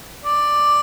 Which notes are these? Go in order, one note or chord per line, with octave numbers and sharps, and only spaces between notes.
D5